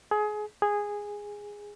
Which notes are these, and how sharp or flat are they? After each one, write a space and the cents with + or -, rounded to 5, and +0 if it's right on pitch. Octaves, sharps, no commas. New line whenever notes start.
G#4 +25
G#4 -10